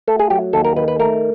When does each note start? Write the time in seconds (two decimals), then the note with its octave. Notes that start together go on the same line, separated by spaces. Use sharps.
0.07 A3 A4
0.20 G#4
0.30 F#3 G4
0.53 D#2 A4
0.65 A#4
0.76 D#3 B4
0.88 B4
1.00 A3 A#4